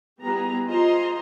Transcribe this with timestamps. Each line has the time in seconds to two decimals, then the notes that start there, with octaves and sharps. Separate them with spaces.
0.22 G3 B3 E4 G4 G#4 A#5
0.67 F4 G#4 C5 D#5 A#5 C6